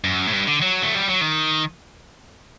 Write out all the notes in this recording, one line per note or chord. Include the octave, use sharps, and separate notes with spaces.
F#2
A2
G2
D3
F#3
A3
G3
F#3
D#3